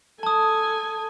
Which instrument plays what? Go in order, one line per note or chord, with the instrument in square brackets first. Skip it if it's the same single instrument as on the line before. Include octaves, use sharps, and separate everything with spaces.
[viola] A4 G#5 [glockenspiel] A5 D#6